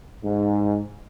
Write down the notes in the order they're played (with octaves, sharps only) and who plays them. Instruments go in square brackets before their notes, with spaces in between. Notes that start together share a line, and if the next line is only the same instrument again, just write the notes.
[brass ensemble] G#2